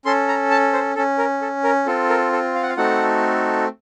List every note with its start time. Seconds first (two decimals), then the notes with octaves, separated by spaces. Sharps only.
0.05 C#4 A4 C6
0.28 A#5
0.51 A5
0.73 C5
0.96 C#4 A4
1.18 A#4
1.41 A4
1.64 A#4
1.86 C4 F4 A4
2.09 A#4
2.32 A4
2.55 F5
2.63 F#5
2.69 F5
2.77 A3 C4 D#4 F#4 A4 F#5